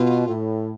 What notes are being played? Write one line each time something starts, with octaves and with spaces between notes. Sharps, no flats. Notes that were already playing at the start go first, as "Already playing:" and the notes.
Already playing: B2 F4
A2